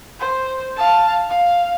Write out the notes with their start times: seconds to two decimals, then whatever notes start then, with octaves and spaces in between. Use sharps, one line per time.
0.19 C5
0.77 F5 A5
1.29 F5